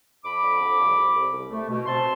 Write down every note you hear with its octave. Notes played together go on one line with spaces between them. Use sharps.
F2 B5 D6
D3
F2
C2
C2
C2
C2
A3
B2
C4 A5 C6